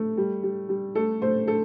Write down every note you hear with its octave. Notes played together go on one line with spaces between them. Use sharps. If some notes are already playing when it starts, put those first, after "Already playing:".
Already playing: A3
G3
G3
G3
A3 A4
A3 C5
A3 A4